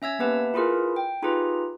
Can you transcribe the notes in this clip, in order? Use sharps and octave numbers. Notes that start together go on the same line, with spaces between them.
C#4 E5 E6 G#6
A#3 B3 G4 B4 E5 A5
E4 F4 G#4 A#4 B4
G5
D#4 F4 G4 G#4 B4 A#5